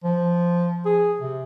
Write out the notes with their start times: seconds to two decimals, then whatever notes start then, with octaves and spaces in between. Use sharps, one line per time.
0.04 F3
0.86 G#4
1.20 C3